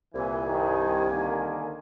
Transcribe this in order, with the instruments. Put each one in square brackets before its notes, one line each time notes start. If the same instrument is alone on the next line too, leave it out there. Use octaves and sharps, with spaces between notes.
[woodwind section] C2 G#5 [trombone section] A#2 E3
[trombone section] G2 D#3
D3 D#3 A#3